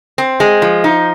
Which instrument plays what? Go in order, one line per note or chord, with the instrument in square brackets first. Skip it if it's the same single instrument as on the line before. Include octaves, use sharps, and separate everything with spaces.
[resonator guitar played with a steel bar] C4
G#3
F3
D#4